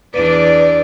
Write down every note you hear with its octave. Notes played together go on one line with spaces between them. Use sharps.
E2 D4 B4 D5